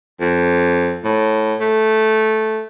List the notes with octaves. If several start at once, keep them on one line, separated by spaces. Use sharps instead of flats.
F2
A2
A3